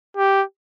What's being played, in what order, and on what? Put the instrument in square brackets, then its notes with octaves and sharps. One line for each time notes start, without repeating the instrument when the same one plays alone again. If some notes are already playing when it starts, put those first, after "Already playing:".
[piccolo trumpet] G4